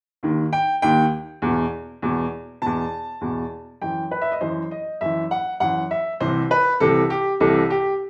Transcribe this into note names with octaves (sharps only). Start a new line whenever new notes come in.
D#2 D#3
G5
D#2 D#3 G5
E2 B2
E2 B2
E2 B2 A5
E2 B2
F#2 E3 G5
B4
E5
D#5
F#2 E3 C5
D#5
F#2 E3 E5
F#5
F#2 E3 F#5
E5
C2 C3 E3 C5
B4
C2 C3 E3 A4
G4
C2 C3 E3 A4
G4